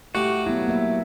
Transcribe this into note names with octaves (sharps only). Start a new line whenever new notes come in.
A2 G3 F#4 F5
F#3 B3 E4
A#3 E5